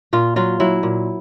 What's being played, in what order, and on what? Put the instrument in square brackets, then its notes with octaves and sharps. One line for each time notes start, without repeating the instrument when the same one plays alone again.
[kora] A#2 F4
F#3 F4
F#3 E4
A#2